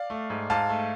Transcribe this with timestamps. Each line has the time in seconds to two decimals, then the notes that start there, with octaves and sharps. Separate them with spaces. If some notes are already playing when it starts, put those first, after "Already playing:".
Already playing: D5 F5
0.10 A3
0.30 G#2
0.50 G#2 F5 A5
0.69 A3